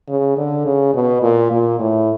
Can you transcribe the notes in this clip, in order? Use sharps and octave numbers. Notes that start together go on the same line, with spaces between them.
C#3
D3
C#3
B2
A#2
A#2
A2